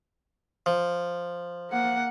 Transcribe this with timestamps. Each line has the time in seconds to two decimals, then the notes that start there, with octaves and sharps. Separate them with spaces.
0.66 F3
1.71 A#3 F#5